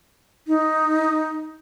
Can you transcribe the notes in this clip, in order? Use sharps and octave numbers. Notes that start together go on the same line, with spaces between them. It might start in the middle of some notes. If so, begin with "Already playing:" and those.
D#4